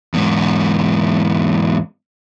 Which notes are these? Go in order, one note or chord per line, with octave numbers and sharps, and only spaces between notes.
E2 G#2